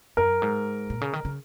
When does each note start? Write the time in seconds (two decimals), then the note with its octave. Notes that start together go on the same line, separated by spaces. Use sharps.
0.17 F#2 A#4
0.42 G#2
0.90 A#2
1.01 C#3
1.13 D#3
1.25 C#3